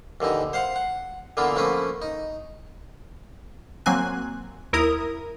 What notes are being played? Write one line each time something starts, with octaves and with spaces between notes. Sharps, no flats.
D#2 D3 E3 D#4
C5 F5 F#5
F#5
D3 E3 A#3 B3 F4
F3 A3 A#3 C#4 B4
D#4
F#3 A#3 C4 G#5 F#6
D#2 E4 A#4 A#5 D#6